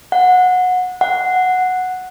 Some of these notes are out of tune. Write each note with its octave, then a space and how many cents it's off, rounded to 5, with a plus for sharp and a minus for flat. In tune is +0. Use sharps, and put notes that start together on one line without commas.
F#5 -20
F#5 -5